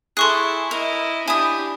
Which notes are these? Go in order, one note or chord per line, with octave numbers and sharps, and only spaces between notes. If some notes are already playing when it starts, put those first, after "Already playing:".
E4 G#4 A4 C6 C#6 F#6
E4 A#4 D#5
D4 E4 G4 G#5 D#6